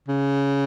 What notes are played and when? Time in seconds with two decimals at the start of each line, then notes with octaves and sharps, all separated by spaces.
0.08 C#3